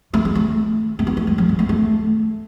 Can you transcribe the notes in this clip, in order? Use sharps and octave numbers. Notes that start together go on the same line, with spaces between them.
A3
G#3
A3
A3
B3
A3
G#3
F#3
G#3
A3
A3